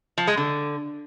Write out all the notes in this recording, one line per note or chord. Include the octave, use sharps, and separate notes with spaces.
F3
G#3
D3